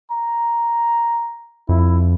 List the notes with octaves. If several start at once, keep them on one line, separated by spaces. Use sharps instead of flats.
A#5
F2 E4